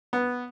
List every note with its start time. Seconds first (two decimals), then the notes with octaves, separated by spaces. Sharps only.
0.13 B3